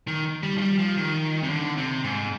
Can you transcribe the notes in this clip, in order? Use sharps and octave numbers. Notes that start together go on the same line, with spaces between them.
D#3
G3
F3
G3
F3
D#3
C3
D3
C3
G#2